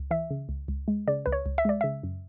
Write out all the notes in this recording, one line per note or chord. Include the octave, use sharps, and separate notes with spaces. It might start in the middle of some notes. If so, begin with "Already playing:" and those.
Already playing: C#2
E3 E5
C#3
C#2
C#2
G#3
C#3 D5
C#2 B4
C#5
C#2
E5
G#3 D5
C#3 E5
F#2